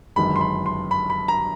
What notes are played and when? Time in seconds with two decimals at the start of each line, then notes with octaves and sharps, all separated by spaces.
0.16 G1 F#2 D#3 G#3 B5
0.36 C6
0.41 B5
0.66 C6
0.91 B5
1.10 B5
1.28 A#5